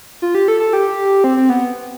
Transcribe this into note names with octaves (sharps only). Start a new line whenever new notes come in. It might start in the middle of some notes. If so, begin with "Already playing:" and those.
F4
G4
A4
A4
G4
C4
C4
B3